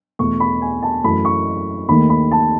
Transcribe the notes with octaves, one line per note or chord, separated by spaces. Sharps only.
E2 B2 A3 C#6
B5
G#5
A5
F#2 E3 A3 B5
C#6
D#2 D#3 A3 B5
B5
A5